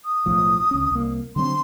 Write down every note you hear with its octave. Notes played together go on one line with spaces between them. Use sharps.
D#6
B1 A2 F3
C#2 C#4
C2 A#3
D3 F#3 C4 C6